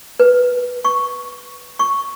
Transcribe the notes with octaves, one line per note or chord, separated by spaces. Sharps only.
B4
C#6
C#6